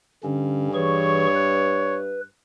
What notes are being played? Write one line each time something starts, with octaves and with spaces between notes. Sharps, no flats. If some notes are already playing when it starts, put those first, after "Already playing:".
G2 D3 C#4
E3 G#4 C#5 C#6
B4